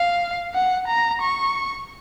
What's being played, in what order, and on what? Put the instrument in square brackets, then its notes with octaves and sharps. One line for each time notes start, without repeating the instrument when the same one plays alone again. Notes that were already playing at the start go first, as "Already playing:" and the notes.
Already playing: [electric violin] F5
F#5
A#5
C#6